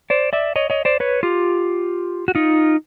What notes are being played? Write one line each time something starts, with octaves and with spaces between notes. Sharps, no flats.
C5 D5
D5 E5
C#5 D#5
C#5 D#5
C5 D5
B4 C#5
F4 G4
F#4
D#4 F4